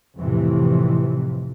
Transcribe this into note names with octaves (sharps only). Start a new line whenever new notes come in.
F2 A2 C3 E3